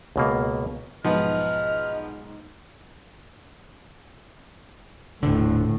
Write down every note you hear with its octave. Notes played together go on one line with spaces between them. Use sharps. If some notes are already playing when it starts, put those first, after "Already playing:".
C#2 B2 A#3
B1 G#2 F3 B3 B4 D#5 F6
D#1 A#1 A2 D3